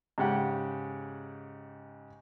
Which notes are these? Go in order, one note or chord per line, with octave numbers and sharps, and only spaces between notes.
G#2 C#3 G4 F#5 G5